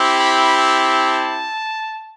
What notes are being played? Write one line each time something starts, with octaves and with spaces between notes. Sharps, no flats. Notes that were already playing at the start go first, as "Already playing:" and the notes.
Already playing: C4 E4 G4
B5
A5